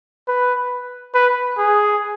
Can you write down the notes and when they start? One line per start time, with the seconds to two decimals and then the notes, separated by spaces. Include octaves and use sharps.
0.28 B4
1.15 B4
1.58 G#4